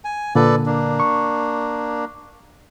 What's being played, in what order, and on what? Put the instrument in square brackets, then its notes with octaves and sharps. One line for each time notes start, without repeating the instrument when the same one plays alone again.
[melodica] G#5
[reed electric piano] A#2 D3 [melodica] A4 B4 D5
[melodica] A#3 D4
[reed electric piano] C#6